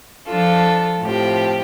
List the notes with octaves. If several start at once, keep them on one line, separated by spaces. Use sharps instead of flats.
F3 D4 F4 A4
A2 F3 C4 G4